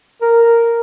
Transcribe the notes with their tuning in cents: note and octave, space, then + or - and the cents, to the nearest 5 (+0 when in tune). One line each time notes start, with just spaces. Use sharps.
A#4 -5